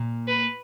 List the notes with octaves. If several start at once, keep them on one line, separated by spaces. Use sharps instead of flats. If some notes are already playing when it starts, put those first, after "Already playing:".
Already playing: A#2
B4